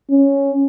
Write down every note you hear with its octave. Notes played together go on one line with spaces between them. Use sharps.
C#4